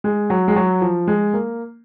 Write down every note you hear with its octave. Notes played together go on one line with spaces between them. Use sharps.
G#3
F#3
G#3
F#3
F3
G#3
A#3